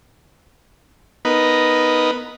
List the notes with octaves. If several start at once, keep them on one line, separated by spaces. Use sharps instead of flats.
B3 D#4 A#4 B4